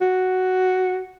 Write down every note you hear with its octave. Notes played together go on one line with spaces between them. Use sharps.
F#4